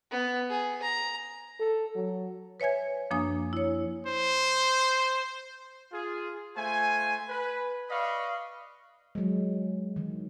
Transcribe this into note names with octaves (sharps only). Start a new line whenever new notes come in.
B3
G#4
A#5
A4
F#3
B4 C#5 E5 G#5 G#6
F#2 F3 A#3 D4 G#5 D#6
E4 C#5
C5
F4 G#4
A3 F4 C5 G#5
B4
B4 D5 D#5 F5 B5 C#6
F#3 G#3
D#3 E3